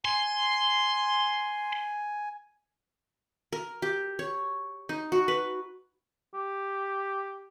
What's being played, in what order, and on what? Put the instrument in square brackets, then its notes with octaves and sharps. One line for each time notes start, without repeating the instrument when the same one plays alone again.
[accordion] G#5 [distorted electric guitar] C6
[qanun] A#4
G4
C#5
D#4
F#4
B4
[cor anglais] G4